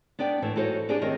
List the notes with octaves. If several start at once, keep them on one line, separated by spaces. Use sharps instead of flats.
B3 D4 D5 G5
A2 E3 A3
E3 D#4 F#4 A4 C5 C#5
D4 G4 G#4 B4 D5
D#3 A3 C4 A#4 C#5 D#5